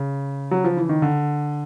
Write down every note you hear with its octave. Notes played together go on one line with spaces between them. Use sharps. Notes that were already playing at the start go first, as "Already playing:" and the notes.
Already playing: C#3
F#3
F3
E3
D#3
D3